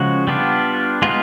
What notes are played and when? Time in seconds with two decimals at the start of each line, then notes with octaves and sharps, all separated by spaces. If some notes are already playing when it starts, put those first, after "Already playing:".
Already playing: C#3 F3 G#3 F#4
0.27 G3 B3 D4 F4
1.02 G#3 B3 D#4 F4